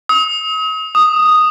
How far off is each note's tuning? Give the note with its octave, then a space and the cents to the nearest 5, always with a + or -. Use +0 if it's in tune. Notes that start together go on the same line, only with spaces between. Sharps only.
D#6 +40
D#6 -5